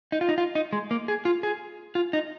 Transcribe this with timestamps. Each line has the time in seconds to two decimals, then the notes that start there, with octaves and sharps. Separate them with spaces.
0.12 D#4
0.21 F4
0.29 D#4
0.38 F4
0.55 D#4
0.73 G#3
0.91 A#3
1.08 G#4
1.25 F4
1.43 G#4
1.95 F4
2.13 D#4